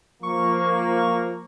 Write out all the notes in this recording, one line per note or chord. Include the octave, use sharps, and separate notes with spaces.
F3 A#3 C#6